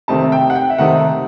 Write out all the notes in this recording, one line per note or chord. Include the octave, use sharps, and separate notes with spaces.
C3 D#3 A3 C4 D#4 A5
G5
F#5
G5
E5
C3 D#3 A3 C4 D#4 F#5